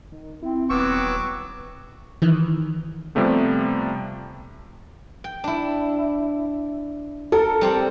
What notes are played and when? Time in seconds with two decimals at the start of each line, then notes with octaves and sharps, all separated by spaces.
0.12 D#3
0.43 C4 E4
0.70 D#1 F#3 B3 C#6 D6 E6
2.22 D#3 E3
3.15 C3 F3 G3 A3 B3
5.24 G5
5.44 D4 E4
7.32 A4 A#4
7.61 G3 C4 D5